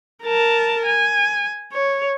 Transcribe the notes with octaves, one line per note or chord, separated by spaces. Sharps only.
A#4 A5
G#5
C#5